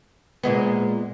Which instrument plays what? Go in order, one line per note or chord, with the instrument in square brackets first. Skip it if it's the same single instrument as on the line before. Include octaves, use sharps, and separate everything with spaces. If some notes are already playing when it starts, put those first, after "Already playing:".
[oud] A#2 G#3 B3